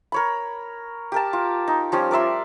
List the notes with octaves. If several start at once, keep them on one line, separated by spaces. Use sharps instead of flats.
A#4 C#5 B5
G4 A#4 A5
F4
D#4
F3 G3 C#4
A#4 D5 E5 C6